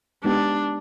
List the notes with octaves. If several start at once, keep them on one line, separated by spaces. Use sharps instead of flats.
G#3 B3 D4 D#4 G4